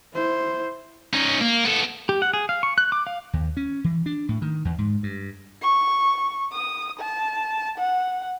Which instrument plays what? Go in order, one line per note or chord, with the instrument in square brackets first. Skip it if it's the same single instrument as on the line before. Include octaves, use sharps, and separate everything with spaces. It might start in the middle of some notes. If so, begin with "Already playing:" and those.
[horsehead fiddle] E4 C5
[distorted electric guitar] C#4 D#4
A#3
B3 A4
[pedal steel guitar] G4
F#5
G#4
F5
C#6
F#6
D6
F5
[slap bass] D#2
C#4
E3
D4
A2
D#3
E2
G#2
G2
[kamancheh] C#6
D#6
A5
F#5